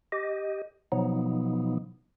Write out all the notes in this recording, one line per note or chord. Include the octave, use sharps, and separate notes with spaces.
G4 D#5
B2 F3 F#3 B3 D#4